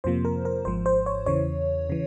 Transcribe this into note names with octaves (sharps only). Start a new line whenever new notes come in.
F2 C3 F3 A#3 C5
A#4
A#4
G#1 G#2 F3 C5
C5
C#5
E2 C#3 E3 C#5
C#3 E3